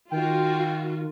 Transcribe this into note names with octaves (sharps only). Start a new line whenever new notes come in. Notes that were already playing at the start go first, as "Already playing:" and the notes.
D#3 F4 F#4 G5